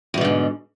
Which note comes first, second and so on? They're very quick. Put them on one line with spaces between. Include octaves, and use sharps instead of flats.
E2 B2 D3 G#2